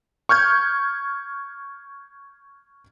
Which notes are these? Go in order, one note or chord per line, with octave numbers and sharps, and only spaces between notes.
C#6 F6 G6 G#6